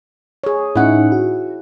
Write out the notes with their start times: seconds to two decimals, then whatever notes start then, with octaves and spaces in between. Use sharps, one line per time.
0.44 G#4 C#5
0.76 A2 C#4 D#4 E4 F#5
1.12 F#4